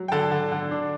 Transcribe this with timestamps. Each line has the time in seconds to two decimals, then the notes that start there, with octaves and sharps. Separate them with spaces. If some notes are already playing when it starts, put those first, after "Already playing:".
Already playing: F#3
0.08 G5
0.12 D3 A4 A5
0.32 D3
0.52 D3
0.71 D4